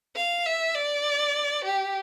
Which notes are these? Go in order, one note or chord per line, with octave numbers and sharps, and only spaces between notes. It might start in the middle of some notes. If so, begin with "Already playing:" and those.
F5
E5
D5
G4